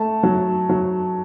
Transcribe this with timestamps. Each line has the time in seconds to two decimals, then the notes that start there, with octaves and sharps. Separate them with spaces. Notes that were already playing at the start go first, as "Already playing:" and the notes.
Already playing: A3 A5
0.23 F#3
0.69 F#3